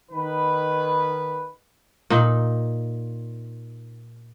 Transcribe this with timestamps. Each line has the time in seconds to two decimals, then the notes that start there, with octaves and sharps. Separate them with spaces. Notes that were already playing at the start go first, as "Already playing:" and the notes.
0.10 D#3 B4
2.10 A#2 D#4